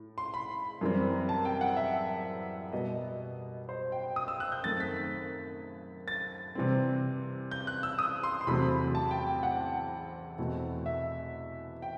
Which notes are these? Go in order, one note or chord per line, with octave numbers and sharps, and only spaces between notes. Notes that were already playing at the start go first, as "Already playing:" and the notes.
Already playing: A2
C6
B5
F#2 E3 G3 C4
A5
G5
F#5
E5
B2 G3 B3 D#5
C5
G5
D#6
E6
F#6
G6
F#2 D#3 A3 C4 A6
B6
B6
A6
C3 E3 G3 C4
G6
F#6
E6
D#6
C6
C6
E2 C3 F#3 A3 C4 B5
A5
G5
G5
F#5
E2 B2 A3 C4
E5
G5